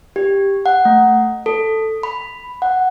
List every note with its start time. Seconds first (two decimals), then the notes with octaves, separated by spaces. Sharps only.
0.16 G4
0.66 F#5
0.85 A3
1.46 A4
2.03 B5
2.62 F#5